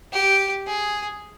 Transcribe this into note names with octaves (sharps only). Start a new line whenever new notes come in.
G4
G#4